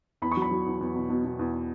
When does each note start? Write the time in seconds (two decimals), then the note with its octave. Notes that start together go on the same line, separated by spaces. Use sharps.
0.22 E2 B5
0.31 C#6
0.37 F#3
0.42 B5
0.51 F#3
0.66 E2
0.81 E2
0.96 B2
1.10 B2
1.25 B2
1.39 E2